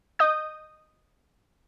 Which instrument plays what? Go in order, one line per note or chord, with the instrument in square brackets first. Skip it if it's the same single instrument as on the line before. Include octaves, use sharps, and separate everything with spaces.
[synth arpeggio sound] D#5 D#6 G6